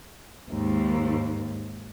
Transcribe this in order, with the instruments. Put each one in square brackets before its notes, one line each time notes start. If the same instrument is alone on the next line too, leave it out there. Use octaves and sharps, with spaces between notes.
[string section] D#2 G#2